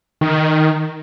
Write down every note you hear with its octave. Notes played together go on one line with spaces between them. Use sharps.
D#3